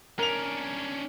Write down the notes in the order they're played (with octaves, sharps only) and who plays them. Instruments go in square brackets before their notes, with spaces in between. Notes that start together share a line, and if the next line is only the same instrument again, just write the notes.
[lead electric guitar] C#4 D4 [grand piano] A#4 F7